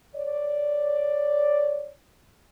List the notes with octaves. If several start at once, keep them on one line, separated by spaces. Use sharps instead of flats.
C#5 D5